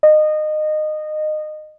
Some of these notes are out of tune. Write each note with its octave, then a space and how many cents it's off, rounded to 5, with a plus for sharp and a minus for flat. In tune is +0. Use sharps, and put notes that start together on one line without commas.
D#5 -25